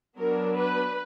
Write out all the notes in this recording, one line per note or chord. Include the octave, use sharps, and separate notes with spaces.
F#3 B3 D4 A#4
B4